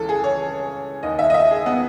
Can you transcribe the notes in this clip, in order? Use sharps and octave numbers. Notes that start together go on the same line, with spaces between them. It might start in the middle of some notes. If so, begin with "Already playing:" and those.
Already playing: C#2 C#3 E3 A4
G#4
C#5
D#2 D#3 D#5
E5
D#5
E5
G#4
B3